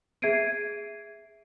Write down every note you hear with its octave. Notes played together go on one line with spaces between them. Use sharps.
G#4 E5 G#6 C7 D7 D#7